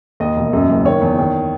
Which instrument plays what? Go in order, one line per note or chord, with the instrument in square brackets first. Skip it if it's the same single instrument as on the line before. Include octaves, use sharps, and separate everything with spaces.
[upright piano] D#2 D#5
E1
F#2
F#1
D#3 C#5
E2
D#3